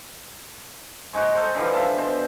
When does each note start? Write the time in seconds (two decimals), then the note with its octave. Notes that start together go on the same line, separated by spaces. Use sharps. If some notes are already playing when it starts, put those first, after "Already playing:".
1.13 G#2 G#3 D#4 F#4
1.35 A4 C5
1.55 D3 E3 F3 G3
1.73 E5 F5 A5
1.97 B2 C5